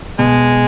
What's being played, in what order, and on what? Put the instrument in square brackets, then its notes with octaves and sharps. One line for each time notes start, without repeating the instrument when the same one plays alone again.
[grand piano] B2 [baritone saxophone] G#3